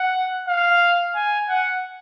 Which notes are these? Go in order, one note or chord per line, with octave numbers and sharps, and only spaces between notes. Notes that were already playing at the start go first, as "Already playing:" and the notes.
Already playing: F#5
F5
G#5
F#5